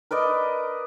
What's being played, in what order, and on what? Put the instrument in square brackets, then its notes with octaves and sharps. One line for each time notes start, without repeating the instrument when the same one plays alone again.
[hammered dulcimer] A#4 B4 D5 D#5